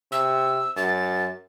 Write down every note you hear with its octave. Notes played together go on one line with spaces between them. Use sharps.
C3 E6
F#2 A6